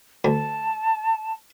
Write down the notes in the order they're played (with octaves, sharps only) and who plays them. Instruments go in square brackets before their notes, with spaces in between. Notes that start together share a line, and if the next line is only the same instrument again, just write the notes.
[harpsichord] D2 [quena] A5